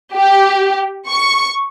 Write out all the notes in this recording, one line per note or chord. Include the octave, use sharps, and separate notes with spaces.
G4
C#6